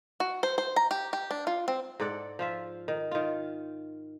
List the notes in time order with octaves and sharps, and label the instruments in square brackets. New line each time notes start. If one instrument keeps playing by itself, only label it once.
[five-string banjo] F#4
C5
C5
A#5
G4
G4
D4
F4
C4
[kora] G#2 A4 D5 F#5
F3 F4 E5
D#3
D#3 F4